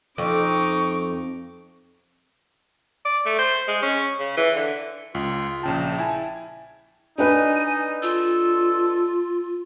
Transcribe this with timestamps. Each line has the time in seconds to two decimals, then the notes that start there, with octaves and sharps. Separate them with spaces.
0.18 F2 D#4 C#6 D6
3.05 D5
3.26 A3
3.38 C5
3.67 G#3
3.82 C#4
4.19 C#3
4.37 E3
4.56 D3
5.15 C#2 F4
5.63 A#1 C#3 G5 A5
5.99 E4 G#5 A5
7.18 D4 D#4 B4 D#5 G#5
8.03 F4 A4